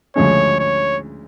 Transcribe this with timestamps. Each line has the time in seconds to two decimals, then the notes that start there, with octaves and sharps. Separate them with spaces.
0.16 D2 C#3 F3 G#3 C#4 C#5
0.59 C#5